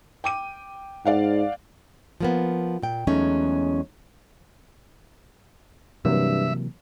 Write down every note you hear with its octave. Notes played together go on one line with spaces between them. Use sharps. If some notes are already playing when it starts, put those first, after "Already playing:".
G5 D6 D#7
G#2 D5 F5 F#5
F3 A#3 B3
A#2 G5
E2 F#3 G#3 A3 C#4 D#4
G2 C3 E3 F#3 A#3 E5